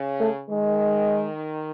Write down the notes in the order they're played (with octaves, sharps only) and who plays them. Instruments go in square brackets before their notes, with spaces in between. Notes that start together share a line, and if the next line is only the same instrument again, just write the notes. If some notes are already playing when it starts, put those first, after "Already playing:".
Already playing: [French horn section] C#3
[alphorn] A3
[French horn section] D#3 [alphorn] G#3